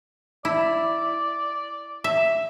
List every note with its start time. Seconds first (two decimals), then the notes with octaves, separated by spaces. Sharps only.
0.45 E4 D5
2.04 E5